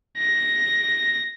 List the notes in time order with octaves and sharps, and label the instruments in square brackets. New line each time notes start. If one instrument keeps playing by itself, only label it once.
[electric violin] A#6